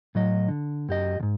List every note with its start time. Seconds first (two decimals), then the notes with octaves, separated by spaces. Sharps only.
0.15 A2 F#3 D#5
0.48 D3
0.89 F#2 G4 D#5
1.20 D2 G#2